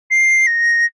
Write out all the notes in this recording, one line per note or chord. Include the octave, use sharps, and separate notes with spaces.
C7
A#6